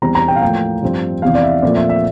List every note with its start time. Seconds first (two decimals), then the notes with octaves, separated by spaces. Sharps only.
0.02 E2 E3 G3 C4 A#5
0.15 A#5
0.28 G5
0.36 F5
0.42 A2 F3 A#3 G5
0.82 G2 F3 C4
1.22 E2 C3 E3 F5
1.35 D5
1.43 E5
1.62 A#2 F3 A3 C4 D5
1.76 E5
1.89 E5